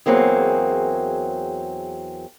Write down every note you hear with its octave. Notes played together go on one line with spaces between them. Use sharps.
E2 G2 F#3 A#3 C4 G#4